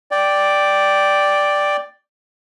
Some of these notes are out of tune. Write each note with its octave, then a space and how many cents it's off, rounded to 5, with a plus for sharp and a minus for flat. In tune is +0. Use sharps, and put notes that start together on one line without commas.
D5 +0 G5 +0